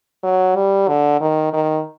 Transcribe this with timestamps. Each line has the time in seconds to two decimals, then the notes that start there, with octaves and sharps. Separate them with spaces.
0.23 F#3
0.56 G3
0.88 D3
1.20 D#3
1.53 D#3